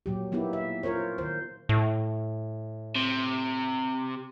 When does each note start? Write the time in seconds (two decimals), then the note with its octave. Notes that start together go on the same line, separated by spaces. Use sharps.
0.06 A#2 F#3 G4
0.32 A#3 B3 D#4 E4 G4
0.53 E5
0.83 F4 A#4 C5 C#5
1.18 D#3 C5
1.69 A2
2.96 C3